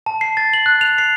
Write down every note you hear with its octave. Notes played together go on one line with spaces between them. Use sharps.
A5
C7
A6
F#7
F#6
F7
C7